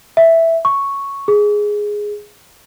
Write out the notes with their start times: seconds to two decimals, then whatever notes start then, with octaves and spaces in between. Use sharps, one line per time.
0.17 E5
0.65 C#6
1.28 G#4